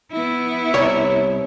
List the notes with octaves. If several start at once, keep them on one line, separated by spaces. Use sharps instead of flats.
B3 E4
C2 C#5